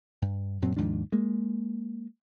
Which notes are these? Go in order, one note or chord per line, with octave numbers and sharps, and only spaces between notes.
G2
F#2 A#2 F#3 C4
D#2 G#2 F3 D4
G#3 A#3